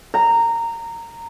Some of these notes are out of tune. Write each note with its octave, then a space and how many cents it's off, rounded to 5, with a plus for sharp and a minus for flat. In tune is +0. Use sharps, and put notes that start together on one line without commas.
A#5 -15